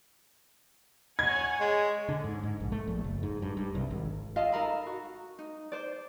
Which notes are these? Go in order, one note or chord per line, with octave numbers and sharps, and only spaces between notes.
C#5 F#5 G#5 G#6
G#3
D3
G#2
G#2
A#1
A3
A#1
F#1
G#2
G2
G2
C2
G#1
F4 A4 D#5 F5
D#4 A4 A#4 B5
F#4
D#4
C5 D5